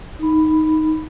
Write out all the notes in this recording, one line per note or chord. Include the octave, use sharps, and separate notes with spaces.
D#4 B5